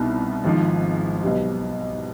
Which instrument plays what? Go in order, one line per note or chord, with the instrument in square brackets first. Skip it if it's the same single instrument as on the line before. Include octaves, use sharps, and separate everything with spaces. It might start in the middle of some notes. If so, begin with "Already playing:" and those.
Already playing: [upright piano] C2 B2 B3 D#4
G#1 G#2 F3
B1 B2 G3